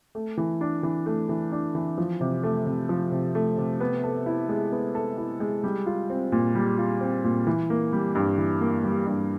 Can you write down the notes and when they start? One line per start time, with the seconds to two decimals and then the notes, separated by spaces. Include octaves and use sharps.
0.15 A3
0.37 E3
0.61 D4
0.83 E3
1.06 A3
1.29 E3
1.52 D4
1.75 E3
1.98 F3
2.21 C3
2.43 A3
2.66 C3
2.89 F3
3.12 C3
3.35 A3
3.58 C3
3.80 B3
4.03 A4
4.26 E4
4.49 G#3
4.72 B3
4.95 A4
5.18 E4
5.40 G#3
5.64 G3
5.86 F4
6.10 C4
6.32 A#2
6.55 G3
6.78 F4
7.01 C4
7.24 A#2
7.47 E3
7.70 A#3
7.93 G3
8.15 G2
8.38 E3
8.61 A#3
8.84 G3
9.07 G2